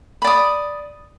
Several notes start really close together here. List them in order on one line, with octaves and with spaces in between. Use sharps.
B5 D5 D#6